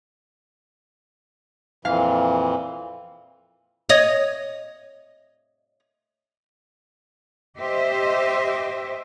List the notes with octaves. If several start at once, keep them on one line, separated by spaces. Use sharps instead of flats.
F2 A#2 E3 F5
C#5 D#5
G4 C5 D#5 E5